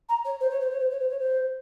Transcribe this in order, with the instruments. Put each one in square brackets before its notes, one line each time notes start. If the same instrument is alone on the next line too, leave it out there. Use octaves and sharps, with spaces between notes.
[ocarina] A#5
C#5
C5
C#5
C5
C#5
C5
C#5
C5
C#5
C5